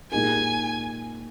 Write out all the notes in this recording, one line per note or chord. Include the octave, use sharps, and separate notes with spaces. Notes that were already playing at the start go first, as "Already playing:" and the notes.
A#2 G#3 D#4 G4 A#4 G#5